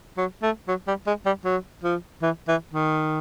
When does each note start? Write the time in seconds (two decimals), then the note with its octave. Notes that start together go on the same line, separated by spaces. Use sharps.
0.17 F#3
0.42 A3
0.68 F#3
0.87 G3
1.07 G#3
1.26 G3
1.45 F#3
1.84 F3
2.22 E3
2.48 E3
2.73 D#3